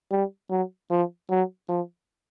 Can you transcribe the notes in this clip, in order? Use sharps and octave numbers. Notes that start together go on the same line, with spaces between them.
G3
F#3
F3
F#3
F3